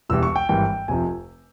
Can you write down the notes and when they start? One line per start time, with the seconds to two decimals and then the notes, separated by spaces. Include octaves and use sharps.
0.09 E1 E2 E3 G3 E6
0.23 C#6
0.36 G5
0.49 G#1 G2 E3 G3 G5
0.88 F1 F2 C3 F3 G#5